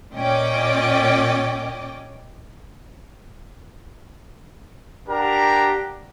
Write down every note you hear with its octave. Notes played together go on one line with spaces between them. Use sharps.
A#2 C#4 D5 D#5 G5 D6
D4 G4 A#4 F#5 A#5